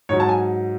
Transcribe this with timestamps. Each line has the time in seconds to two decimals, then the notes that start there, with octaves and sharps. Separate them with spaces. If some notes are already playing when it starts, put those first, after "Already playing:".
0.09 G#2 F#3 C#5
0.20 A5
0.29 G#5